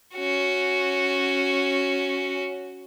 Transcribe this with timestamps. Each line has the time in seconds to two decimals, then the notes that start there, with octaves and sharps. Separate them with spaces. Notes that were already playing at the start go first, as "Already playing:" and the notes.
0.15 C#4 F#4